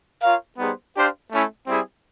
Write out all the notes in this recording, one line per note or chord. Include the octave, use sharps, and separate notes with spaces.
F4 A#4 C#5 F5
G3 B3 D#4 G#4 C5
D4 G4 C5 F5
A3 C#4 E4
G3 C4 E4 G#4